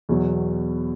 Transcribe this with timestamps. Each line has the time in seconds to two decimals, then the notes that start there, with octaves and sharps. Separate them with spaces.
0.09 E2 B2 F#3